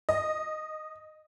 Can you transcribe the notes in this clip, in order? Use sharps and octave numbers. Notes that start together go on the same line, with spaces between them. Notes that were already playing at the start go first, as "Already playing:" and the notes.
D#5